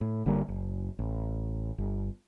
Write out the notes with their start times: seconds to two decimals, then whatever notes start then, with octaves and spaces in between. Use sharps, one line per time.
0.01 A2
0.26 G1 D3 G3 A#3
0.48 F#1
0.99 A1
1.78 G1